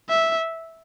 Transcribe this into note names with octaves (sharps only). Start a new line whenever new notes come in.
E5